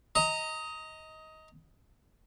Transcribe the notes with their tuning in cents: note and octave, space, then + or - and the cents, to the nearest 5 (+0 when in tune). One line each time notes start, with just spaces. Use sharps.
D#5 +20 A#5 -15